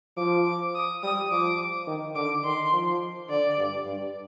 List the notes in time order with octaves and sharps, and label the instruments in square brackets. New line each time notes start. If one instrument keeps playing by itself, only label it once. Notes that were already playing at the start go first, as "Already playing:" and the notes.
[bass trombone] F3 [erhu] D6
[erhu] D6
D#6
[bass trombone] G3 [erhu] D#6
[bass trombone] F3 [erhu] D6
[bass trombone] D#3
[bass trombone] D3 [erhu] D6
[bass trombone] D#3 [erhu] C6
[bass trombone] F3
[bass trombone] D3 [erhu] D5
[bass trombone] G2
G2